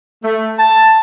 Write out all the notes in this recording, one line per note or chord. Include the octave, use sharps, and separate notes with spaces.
A3
A5